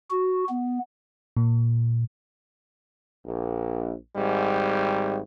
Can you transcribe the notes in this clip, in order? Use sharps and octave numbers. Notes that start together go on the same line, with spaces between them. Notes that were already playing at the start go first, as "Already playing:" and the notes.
F#4
B3
A#2
A#1
G#1 G#2 G3